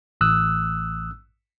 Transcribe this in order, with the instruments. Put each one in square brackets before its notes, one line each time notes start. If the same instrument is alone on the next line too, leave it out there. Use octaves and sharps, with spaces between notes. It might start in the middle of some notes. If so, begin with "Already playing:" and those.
[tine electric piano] A1 D#6 E6 F#6